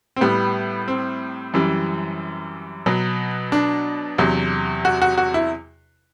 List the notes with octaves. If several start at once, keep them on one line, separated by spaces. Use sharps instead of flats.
C4
A2 G3 B3
C4
F#2 E3 G3
B2 F#3
D4
E2 C3 F#3
F#4
F#4
F#4
E4